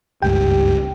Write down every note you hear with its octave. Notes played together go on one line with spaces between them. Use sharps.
F#1 C#2 G2 G4 G5